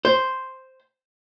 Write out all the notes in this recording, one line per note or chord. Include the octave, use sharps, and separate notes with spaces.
C5